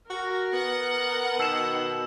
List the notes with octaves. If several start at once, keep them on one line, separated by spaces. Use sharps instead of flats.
F#4 A#4
B3 F#5
B2 D#3 E6 E7